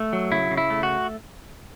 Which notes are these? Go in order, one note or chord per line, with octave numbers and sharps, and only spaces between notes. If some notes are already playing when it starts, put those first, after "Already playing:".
Already playing: A3
F#3
C#3 E4
C#3
E4
A3
F#4